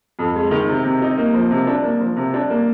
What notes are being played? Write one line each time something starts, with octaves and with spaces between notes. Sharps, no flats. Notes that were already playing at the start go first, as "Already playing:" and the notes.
F2
G#3
D#3
C3
C3
D#4
A#3
F3
C3
D4
A#3
F3
C3
D4
A#3